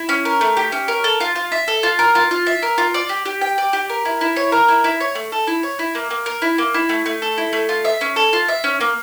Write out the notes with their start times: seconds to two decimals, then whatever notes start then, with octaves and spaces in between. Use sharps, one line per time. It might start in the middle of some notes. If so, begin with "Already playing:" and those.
Already playing: E4
0.09 C#4
0.25 A#4
0.41 A3
0.57 G4
0.72 C#4
0.88 A#4
1.04 A4
1.20 F4
1.36 F4
1.52 E5
1.68 A4
1.83 F4
1.99 A#4
2.15 F4
2.31 F4
2.46 E5
2.62 A#4
2.78 F4
2.94 D5
3.09 G4
3.26 G4
3.41 G5
3.58 D5
3.73 G4
3.89 A#4
4.05 E4
4.21 E4
4.36 C#5
4.52 A#4
4.68 E4
4.84 E4
5.00 C#5
5.15 A3
5.32 A4
5.47 E4
5.63 C#5
5.79 E4
5.95 A#3
6.11 A#3
6.26 A#4
6.42 E4
6.58 A#3
6.74 E4
6.89 A3
7.06 A3
7.22 A4
7.38 E4
7.53 A3
7.69 F4
7.85 E5
8.01 C#4
8.16 A4
8.33 F4
8.49 E5
8.64 C#4
8.80 A#3